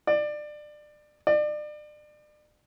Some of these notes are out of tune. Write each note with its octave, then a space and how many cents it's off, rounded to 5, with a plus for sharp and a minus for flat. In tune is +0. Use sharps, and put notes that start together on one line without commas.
D5 +25
D5 +35